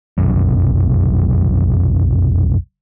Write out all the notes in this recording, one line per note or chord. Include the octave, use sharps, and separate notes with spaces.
F1 B1 F#2